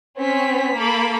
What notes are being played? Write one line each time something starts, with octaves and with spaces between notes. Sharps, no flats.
C4 C#4 B6
A#3 A4 B5 D6